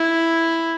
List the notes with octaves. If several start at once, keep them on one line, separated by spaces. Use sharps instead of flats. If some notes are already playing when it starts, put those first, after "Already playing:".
Already playing: E4